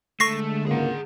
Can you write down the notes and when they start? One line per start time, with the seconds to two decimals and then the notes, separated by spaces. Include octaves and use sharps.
0.20 D3 G#3 A3 C#6 A#6 C7
0.67 G#1 C#2 A#3 G#4 F#5